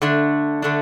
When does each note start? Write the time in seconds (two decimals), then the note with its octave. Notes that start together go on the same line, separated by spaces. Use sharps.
0.02 D3 A3 D4
0.62 D3 A3 D4